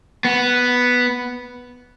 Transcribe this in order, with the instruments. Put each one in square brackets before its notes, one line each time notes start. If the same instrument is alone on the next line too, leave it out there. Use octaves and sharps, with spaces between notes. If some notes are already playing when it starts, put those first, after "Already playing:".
[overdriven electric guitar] B3